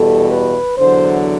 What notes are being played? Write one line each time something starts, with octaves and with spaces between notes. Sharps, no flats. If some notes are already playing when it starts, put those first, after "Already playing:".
Already playing: E2 B2 G3 A4
B4
E2 D3 F#3 C5